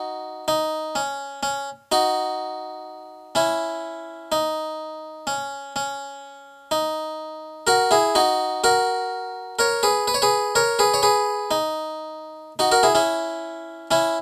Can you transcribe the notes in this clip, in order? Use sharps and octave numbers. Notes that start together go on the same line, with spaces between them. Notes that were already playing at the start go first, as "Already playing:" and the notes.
Already playing: D#4 F#4
D#4
C#4
C#4
D#4 F#4
C#4 E4
D#4
C#4
C#4
D#4
F#4 A#4
E4 G#4
D#4 F#4
F#4 A#4
A#4 C#5
G#4 B4
B4
C#5
G#4 B4
A#4 C#5
G#4 B4
C#5
G#4 B4
D#4
D#4 F#4
F#4 A#4
E4 G#4
C#4 E4
C#4 E4